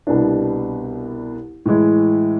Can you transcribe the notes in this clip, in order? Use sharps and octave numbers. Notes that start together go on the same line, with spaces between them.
C2 B2 G3 B3 D4
A2 E3 G#3